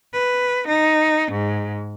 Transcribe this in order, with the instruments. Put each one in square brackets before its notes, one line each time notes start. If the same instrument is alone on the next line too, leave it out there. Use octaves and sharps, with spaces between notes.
[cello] B4
D#4
G#2